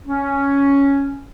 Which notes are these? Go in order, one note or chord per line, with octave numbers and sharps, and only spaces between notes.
C#4